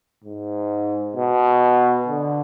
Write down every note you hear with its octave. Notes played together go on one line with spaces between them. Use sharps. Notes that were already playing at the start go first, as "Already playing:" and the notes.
G#2
B2
D3